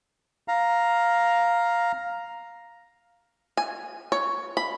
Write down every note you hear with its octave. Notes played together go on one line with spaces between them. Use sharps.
F5 A#5
G#5
C#5
B5